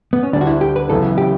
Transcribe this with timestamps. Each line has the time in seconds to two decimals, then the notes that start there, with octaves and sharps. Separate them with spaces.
0.13 B3
0.23 C#4
0.33 D2 D3 G3 D4
0.41 F#4
0.47 E4
0.61 G4
0.76 B4
0.90 F#2 C#3 E3 B3 A4
1.18 G4